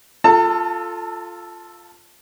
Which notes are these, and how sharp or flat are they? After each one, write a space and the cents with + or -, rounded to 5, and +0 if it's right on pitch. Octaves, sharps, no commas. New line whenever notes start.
F4 +0 A4 +0 A5 +40